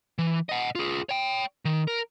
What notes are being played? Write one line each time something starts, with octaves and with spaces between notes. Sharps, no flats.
E3
D#5 F#5
F4 G#4
C#5 G5
D#3
A#4